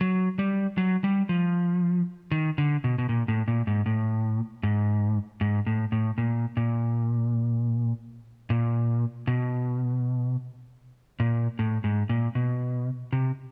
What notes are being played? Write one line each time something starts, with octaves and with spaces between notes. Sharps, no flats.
F#3
G3
F#3
G3
F3
D#3
D3
B2
B2
A#2
A2
A#2
G#2
A2
G#2
G#2
A2
A2
A#2
A#2
A#2
B2
A#2
A2
G#2
A#2
B2
C3